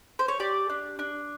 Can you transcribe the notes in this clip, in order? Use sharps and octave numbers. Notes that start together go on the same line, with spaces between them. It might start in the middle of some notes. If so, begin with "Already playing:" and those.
C5
C#5
G4 D5
D4
D4